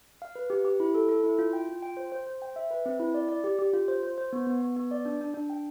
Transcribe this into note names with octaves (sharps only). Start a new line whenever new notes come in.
F5
B4
G4
G4
E4
A4
A4
E4
F4
G5
F4
G5
C5
C5
C5
G5
E5
B4
C4
E4
D5
D5
G4
G4
F4
C5
C5
C5
B3
B3
B3
B3
D5
D4
D4
D4
G5